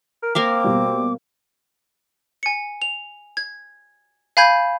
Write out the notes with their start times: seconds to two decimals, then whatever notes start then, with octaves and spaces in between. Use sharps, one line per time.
0.23 A#4
0.35 A#3 C4 A#4 F5 D6
0.64 B2 G3
2.43 G#5 C#7
2.82 F7
3.37 G#6
4.37 F5 G#5 B5 G6 G#6